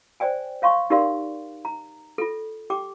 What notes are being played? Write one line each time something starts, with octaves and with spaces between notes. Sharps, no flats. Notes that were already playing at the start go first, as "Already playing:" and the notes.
C5 D5 G5 G#5
C#5 F5 C6 C#6
D#4 G4 A#4 D5 F5 C6
A#5
F4 A4
G4 G5 D6